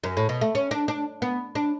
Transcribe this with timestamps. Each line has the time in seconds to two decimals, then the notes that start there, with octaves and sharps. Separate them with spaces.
0.04 F#2
0.17 A2
0.29 B2
0.41 A3
0.55 C#4
0.71 D4
0.88 D4
1.22 B3
1.55 D4